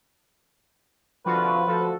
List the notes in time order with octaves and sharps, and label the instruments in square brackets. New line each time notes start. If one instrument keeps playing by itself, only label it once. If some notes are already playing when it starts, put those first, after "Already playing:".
[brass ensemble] C2 D3 [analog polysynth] F3 F4 F#4 [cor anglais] B4
[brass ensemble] D2 F#4 A4 [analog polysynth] F3